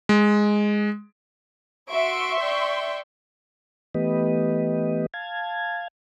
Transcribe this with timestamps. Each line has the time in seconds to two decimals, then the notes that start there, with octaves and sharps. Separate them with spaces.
0.09 G#3
1.90 F#4 E5 C6 C#6 D7
2.40 D5 G5
3.95 E3 A3 B3 G4 B4 D#5
5.14 F5 A5 G#6